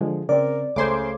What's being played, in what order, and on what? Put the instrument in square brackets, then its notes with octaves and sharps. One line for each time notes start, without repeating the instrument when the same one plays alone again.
[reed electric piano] D3 F3 G#3
[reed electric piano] C#3 C4 [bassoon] A#4 [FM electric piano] D5
[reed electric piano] C#2 A3 G#6 [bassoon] C#3 [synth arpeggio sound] C5 C6 D6